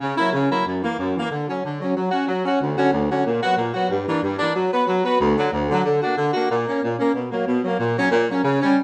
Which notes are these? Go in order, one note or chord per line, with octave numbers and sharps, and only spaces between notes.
C#3
F#3 A#3 E4
C#3
F#3 A#3 E4
F#2
E3 A#3
F#2
E3 A#3
D3
F#3 C#4
D3
F#3 C#4
F#3
C#4 F#4
F#3
C#4 F#4
D2
D3 F#3 C#4 F#4
D2
D3 F#3 C#4 F#4
A#2
F#3 B3 F#4
A#2
F#3 B3 F#4
G2
E3 A#3 D4
G2
E3 A#3 D4
F#3
B3 F#4 B4
F#3
B3 F#4 B4
D2
D3 F#3
D2
D3 F#3
D3
A#3 D4 F#4
D3
A#3 D4 F#4
A#2
A#3 C#4
A#2
A#3 C#4
B2
F#3 A#3
B2
F#3 A#3
A#2
F#3 A#3 C#4
A#2
F#3 A#3 C#4
C#3
G3 C#4